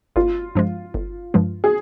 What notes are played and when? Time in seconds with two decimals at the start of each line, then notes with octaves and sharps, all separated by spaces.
0.16 G1 F4
0.55 G2 F3 G#3
0.94 G1
1.34 G2 F3 G#3
1.64 G#4